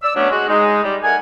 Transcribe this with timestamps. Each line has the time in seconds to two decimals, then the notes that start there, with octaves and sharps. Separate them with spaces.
0.03 D5 E6
0.16 F#3 A3 B3 C#4 D4
0.30 G#3 F#4
0.48 G#3 D#4
0.83 G3
1.03 A3 A#4 F#5 G#5